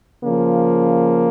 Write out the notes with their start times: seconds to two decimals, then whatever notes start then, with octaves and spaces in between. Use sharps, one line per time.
0.23 C#3 F3 A#3